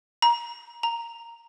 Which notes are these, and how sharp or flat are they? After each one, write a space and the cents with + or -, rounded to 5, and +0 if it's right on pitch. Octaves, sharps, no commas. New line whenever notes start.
A#5 +25
A#5 -5